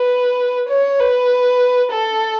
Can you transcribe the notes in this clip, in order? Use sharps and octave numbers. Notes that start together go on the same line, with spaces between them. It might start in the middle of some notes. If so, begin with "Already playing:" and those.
Already playing: B4
C#5
B4
A4